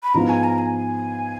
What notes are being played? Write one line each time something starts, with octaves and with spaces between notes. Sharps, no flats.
B5
G#2 F3 B3 F4 A#5
G#5
A#5
G#5